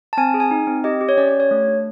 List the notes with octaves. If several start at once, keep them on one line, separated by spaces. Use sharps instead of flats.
A5
C4 G#5
G#4
G#5
D#4
C4
G4 D#5
G4
C#5
C#4 D5
C#5
G4
C#5
A3
D4